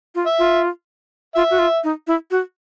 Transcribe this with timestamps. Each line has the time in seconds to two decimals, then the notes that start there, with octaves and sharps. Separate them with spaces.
0.15 F4
0.26 E5
0.39 F4
1.35 F4 E5
1.51 F#4
1.59 F4
1.84 D#4
2.07 E4
2.31 F#4